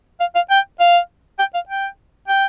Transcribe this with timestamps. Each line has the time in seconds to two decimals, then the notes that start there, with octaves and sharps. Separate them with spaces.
0.20 F5
0.35 F5
0.50 G5
0.80 F5
1.39 G5
1.54 F5
1.69 G5
2.28 G5